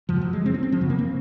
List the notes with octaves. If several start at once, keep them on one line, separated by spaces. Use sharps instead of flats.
F#2 C#3 F3
F#3
G#3
C4
C#4
C4
F3
F#2 C#3 F#3
A#3
C4